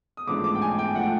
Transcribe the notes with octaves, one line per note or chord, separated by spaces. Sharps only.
D#6
A1 G#2 F3 A3 D4 D6
D6
G5
G#5
G5
F3 A3 D4 F#5